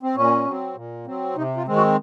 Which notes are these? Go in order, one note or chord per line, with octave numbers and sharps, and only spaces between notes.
C4
A#2 C#4
F#3 C4
A#2
F#3 C4
C3 D#4
F4
D#3 G#3 C4
F#4